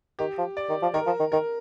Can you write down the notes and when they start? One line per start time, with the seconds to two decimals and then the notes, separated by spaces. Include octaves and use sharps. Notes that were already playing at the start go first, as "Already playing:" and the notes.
0.19 D#3 G4
0.38 F3
0.57 D5
0.69 D#3
0.82 F3
0.94 D#3 A#4
1.06 F3
1.19 D#3
1.32 D#3 A#4